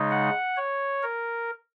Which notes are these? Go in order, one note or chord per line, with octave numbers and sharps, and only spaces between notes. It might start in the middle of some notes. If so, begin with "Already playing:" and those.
Already playing: C#3 G#3 D#4
F#5
C#5
A#4